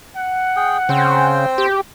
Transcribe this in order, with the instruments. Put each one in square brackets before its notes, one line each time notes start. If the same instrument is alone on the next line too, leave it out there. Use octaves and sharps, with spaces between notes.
[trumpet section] F#5
[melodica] G#4 G5
[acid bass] C#3 [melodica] C4 C5 G5
[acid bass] G4